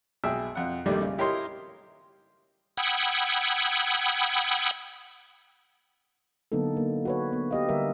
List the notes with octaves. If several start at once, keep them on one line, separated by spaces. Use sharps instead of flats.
B1 B2 G#4 E5 G5 E6
F2 F#5
A#1 G2 D#3 G3 A3
C#3
E4 G4 A#4 C#5 D#5 C6
F#5 G5 B5 D#6 E6 G#6
D3 F#3 A#3 B3 D#4 A4
A#3
F#4 B4 C#5
B3
G4 D#5 F5
D3 G3 A#4 E5